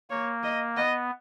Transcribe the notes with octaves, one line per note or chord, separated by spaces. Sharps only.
A#3 C#5
D#5
B3 D#5